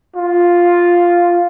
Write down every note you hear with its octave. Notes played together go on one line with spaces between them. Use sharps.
F4